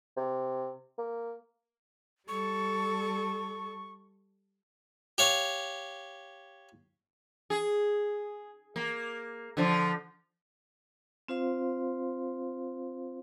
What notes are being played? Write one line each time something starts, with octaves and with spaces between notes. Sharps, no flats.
C3
A#3
G3 A4 C#6
G4 C#5 F5
G#4
A#3
D3 F3
C4 F4 C5 F5 C6